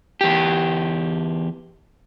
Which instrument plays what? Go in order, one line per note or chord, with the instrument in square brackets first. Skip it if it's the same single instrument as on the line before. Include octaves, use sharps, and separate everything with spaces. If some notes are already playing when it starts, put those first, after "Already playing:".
[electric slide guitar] E2 G4